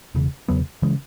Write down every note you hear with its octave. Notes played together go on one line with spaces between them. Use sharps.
E1 E2 C#3
E1 E2 C#3 F#3 B3
C#3 E3 G#3